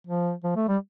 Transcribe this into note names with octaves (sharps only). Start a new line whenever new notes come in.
F3
F3
A3
G3